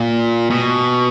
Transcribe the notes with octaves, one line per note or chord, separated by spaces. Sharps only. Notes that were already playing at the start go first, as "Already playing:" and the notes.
Already playing: A#2
B2